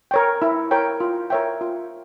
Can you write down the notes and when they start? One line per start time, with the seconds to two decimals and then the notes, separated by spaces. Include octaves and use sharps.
0.11 A#4 C#5 G5
0.42 E4
0.71 A#4 C#5 G5
1.00 F4
1.30 A#4 C#5 E5 G5
1.61 F4